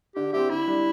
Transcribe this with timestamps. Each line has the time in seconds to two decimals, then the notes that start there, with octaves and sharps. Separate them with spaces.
0.15 D3 G4
0.33 C4 E4 G4
0.50 D3 E4
0.67 G3 D4